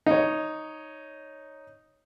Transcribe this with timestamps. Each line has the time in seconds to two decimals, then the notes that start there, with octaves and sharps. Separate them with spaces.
0.06 D#4 C#5